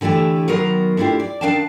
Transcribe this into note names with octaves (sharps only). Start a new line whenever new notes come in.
D3 E3 A3 E4 G4
D#3 F#3 B3 A#4 C5
A3 D4 E4 F4 G4
D5
D#3 B3 D4 F5 G5 A5